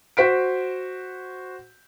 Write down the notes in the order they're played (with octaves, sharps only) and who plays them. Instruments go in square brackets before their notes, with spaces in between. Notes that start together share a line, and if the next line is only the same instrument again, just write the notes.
[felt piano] F#4 C5 B6 D7